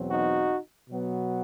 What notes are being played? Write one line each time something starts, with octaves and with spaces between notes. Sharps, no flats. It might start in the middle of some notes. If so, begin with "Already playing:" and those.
Already playing: E2 B2 F#3 C4
D#4 F#4
B2 F#3 B3